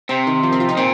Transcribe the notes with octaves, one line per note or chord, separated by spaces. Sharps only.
C3 C4
D#3
F3
C4
F4
D#4
A#2 C4